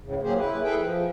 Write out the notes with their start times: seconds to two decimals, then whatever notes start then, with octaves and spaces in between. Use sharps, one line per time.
0.03 D2 A2 C#3
0.23 F#3 A#3 G4 G#4 C5
0.38 E4 B4
0.63 G#4 A4 B4 E5 G5
0.79 F3